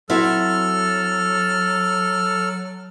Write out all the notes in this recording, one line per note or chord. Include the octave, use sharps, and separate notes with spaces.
F#3 C4 E4 F#4 A4 F6